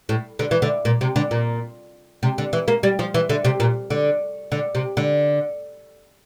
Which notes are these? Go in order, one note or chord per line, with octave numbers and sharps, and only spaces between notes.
A2
D3
E3
D3
A#2
C3
D3
A#2
C3
D3
E3
A#3
G3
F3
E3
D3
C3
A#2
D3
D3
C3
D3